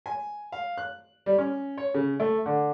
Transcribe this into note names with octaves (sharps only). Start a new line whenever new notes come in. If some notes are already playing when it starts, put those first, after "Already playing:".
G#5
F5
F#6
G3
C#4
C#5
C#3
A3
D3